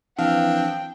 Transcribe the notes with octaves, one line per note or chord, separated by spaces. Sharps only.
E3 F3 C4 D4 F5 G5